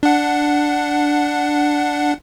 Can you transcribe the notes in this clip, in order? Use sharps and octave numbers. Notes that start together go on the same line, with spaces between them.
D4 F#5